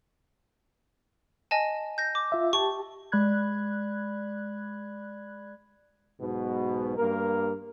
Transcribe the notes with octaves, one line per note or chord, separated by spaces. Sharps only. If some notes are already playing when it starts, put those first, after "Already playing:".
D#5 G#5 A5
G6 A#6
D6
F4 E5
G4 A5 C#6
G#3 D5 B5 F#6 G#6
B1 G#2 B2
G2 A#3 A#4